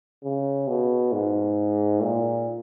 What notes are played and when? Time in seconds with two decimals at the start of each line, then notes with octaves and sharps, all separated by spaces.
0.24 C#3
0.68 B2
1.12 G#2
2.02 A#2